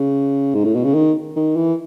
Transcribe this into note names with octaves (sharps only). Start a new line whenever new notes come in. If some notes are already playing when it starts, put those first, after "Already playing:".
Already playing: C#3
G#2
A2
B2
C#3
D#3
D#3
E3